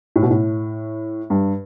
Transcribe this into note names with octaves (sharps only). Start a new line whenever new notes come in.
A2
B2
A2
G2